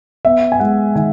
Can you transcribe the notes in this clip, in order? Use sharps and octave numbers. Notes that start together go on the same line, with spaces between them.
B3 E5
G#5
G#3 F#5
D#3 G#5